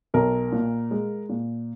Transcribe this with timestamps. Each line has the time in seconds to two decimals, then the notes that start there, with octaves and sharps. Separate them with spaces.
0.14 B1 A#4
0.52 A#2
0.91 G#3
1.29 A#2